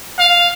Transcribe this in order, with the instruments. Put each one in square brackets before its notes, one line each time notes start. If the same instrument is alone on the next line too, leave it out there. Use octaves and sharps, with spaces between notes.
[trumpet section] F5